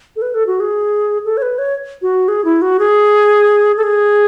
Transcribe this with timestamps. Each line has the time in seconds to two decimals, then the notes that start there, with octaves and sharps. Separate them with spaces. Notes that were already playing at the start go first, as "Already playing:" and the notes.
0.16 A4
0.22 B4
0.34 A4
0.47 F#4
0.60 G#4
1.25 A4
1.37 C#5
1.42 B4
1.58 C#5
2.02 F#4
2.28 G#4
2.45 E4
2.62 F#4
2.79 G#4
3.77 A4
3.83 G#4